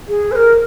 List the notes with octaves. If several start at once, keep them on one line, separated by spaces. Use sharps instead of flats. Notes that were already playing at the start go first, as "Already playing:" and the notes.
G#4
C5
A#4